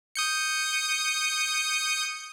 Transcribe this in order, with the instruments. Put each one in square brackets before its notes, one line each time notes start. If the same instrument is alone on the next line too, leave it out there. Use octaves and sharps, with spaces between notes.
[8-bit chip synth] D#6 G6 C#7